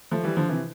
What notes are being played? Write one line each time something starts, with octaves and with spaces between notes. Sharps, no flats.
F3 A3
E3 G3
D3 F3
C3 E3